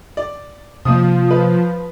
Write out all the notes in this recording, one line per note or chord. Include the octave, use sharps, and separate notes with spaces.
D5
C3 F3 A#3 D#6
B4